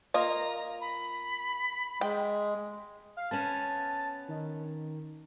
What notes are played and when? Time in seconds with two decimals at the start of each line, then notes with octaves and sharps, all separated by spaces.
0.14 A#3 F4 D#5 A#5
0.80 B5
2.01 G#3 G5
3.17 F5
3.31 B3 C#4 A5
4.28 D#3